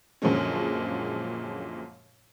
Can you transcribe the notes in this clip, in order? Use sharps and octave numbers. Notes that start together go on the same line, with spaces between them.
F#2 A#2 D3 F3 G#3 C#4